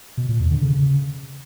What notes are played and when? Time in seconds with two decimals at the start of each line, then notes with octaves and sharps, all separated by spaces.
0.17 B2
0.29 A#2
0.40 E2
0.51 D3
0.62 C#3